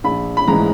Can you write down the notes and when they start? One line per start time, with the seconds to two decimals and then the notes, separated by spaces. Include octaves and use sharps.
0.04 A#1 B5
0.37 B5
0.48 G#2 E3 G#3 A#5